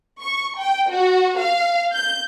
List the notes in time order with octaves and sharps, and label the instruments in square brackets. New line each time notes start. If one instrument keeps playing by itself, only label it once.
[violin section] C#6
G5
F#4
F5
G6